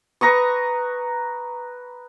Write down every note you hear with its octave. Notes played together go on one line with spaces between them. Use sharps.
B4 A#5 C#6 D#6